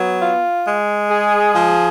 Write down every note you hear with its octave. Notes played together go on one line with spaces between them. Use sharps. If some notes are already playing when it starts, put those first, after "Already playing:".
Already playing: F#3 B3
F4
G#3
G#4
F3